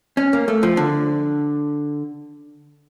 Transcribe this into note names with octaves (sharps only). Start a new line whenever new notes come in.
C#4
A#3
A3
F3
D3